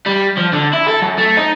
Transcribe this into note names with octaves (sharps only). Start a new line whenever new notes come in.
G3
F3
D3
E4
A4
F#2
A3
D#4